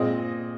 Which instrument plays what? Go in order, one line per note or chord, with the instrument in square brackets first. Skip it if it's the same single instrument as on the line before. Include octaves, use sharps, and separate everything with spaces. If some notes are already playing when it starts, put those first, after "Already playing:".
Already playing: [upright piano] A#2 G#3 C4 D#5